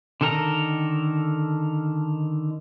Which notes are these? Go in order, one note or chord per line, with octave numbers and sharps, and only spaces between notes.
D3 D#3 A4 A#4 A#5